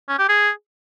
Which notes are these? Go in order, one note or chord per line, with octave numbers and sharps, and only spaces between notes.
C#4
G4
G#4